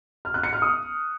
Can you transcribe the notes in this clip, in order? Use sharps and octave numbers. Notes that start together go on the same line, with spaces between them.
F6
F#6
C#7
F6
D#6